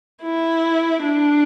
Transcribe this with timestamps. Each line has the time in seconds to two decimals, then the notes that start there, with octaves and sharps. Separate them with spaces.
0.22 E4
1.02 D4